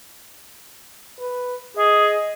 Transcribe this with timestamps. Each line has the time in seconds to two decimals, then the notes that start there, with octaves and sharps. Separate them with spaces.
1.19 B4
1.77 G#4 D#5